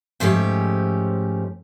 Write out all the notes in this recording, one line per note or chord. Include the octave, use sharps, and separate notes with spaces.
G#2 F3 A3 C#4 G4